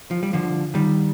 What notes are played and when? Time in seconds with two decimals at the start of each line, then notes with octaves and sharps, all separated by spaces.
0.11 F3
0.23 G3
0.33 D3 F3
0.74 D#3 G3